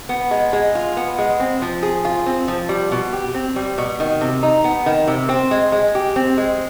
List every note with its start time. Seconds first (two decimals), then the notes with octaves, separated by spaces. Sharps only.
0.09 B3
0.31 G#3
0.53 G#3
0.75 F4
0.97 B3
1.18 G#3
1.40 C4
1.62 F3
1.83 G#4
2.05 F4
2.26 C4
2.48 F3
2.69 G3
2.92 B2
3.13 G4
3.35 C4
3.56 G3
3.78 B2
4.00 D#3
4.21 C3
4.43 D#4
4.64 B3
4.86 D#3
5.08 C3
5.29 C4
5.51 G#3
5.72 G#3
5.95 G4
6.16 C4
6.38 G#3